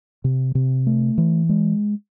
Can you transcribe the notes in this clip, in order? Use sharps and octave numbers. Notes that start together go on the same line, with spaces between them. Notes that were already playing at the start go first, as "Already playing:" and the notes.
C3
C3
A3
E3
G#3